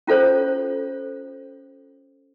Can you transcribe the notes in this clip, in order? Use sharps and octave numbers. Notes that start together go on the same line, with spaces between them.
C#4 F4 A4 C5 C#5